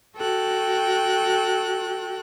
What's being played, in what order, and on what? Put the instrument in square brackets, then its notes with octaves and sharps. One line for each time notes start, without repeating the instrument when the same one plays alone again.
[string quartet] F#4 A4 G5 F#6